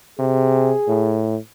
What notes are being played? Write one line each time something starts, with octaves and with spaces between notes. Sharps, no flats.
C3 G#4
A2